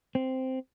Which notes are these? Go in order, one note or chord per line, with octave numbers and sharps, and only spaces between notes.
C4